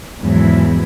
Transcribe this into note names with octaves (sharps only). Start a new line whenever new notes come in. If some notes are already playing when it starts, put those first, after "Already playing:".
E2 G#2 F3 F#3 E4